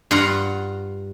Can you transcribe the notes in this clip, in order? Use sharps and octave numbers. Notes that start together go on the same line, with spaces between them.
G2 F4 F#5 A#5